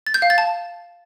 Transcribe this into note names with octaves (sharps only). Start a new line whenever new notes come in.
A6
G6
F5
A6
A5